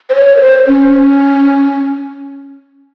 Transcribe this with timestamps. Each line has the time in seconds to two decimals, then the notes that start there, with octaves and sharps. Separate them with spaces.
0.10 C5
0.15 C#5
0.37 A#4
0.41 C5
0.67 C#4